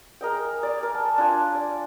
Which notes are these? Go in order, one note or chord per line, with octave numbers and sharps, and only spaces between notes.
G#4 A#4 D#5 G5
D5 G#5
A#4
A5
D4 F4 G#5
D5